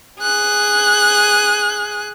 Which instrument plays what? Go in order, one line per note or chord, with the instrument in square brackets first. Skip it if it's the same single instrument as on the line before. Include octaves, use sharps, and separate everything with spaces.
[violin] G#4 F#6